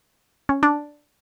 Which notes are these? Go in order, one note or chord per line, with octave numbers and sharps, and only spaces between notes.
C#4
D4